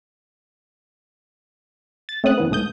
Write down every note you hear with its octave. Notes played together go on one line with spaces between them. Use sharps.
A6
A3 C4 C#4 D#6 F#6
F#2 E3 B3
B1 G#2 A3 D#6 G6